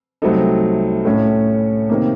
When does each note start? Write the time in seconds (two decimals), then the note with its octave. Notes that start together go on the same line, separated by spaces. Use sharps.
0.22 C2 C3 F#3 A3 D#4
1.05 A2 A3 C#4
1.89 C3 D#3 A#3